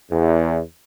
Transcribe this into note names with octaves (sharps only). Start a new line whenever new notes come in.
E2